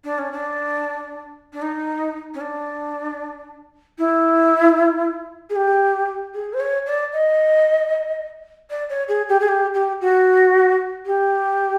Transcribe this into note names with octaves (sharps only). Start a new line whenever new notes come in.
D4
C#4
D4
D4
D#4
C#4
D4
E4
G#4
G4
G#4
C5
C#5
D5
D#5
D5
C#5
G#4
G4
G#4
G4
G4
F#4
G4